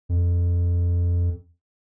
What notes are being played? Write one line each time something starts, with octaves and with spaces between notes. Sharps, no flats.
F2